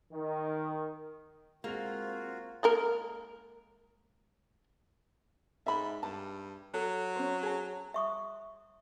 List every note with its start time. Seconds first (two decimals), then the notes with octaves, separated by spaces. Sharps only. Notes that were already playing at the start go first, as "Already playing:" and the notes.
0.13 D#3
1.64 G#3 A#3 C4 F4 F#4 F7
2.63 G#3 A#3 A#4
5.66 G#2 E5 B5
6.03 G2 A5
6.74 F#3 A4
7.16 C#4 C5
7.43 G#4 A5
7.94 E5 C#6 D#6